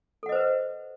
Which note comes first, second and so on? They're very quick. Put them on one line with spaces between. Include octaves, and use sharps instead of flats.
A4 F#5 D#5 C5 B4